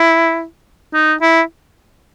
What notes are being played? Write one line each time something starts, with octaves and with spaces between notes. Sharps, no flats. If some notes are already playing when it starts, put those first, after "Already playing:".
Already playing: E4
D#4
E4